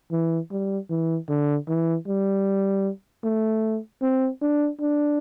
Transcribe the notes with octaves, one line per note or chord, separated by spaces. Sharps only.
E3
G3
E3
D3
E3
G3
A3
C4
D4
D4